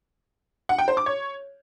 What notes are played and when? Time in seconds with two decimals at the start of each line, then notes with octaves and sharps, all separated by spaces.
0.69 F#5
0.79 G5
0.88 C5
0.97 D6
1.06 C#5